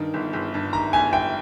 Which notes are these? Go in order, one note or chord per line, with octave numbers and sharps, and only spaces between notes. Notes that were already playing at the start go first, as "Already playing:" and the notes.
Already playing: G2 D#3
G1
G1
G2
D#3 A#5
G1 G#5
G1 G5